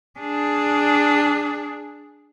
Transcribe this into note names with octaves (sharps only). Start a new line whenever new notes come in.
D4 G#4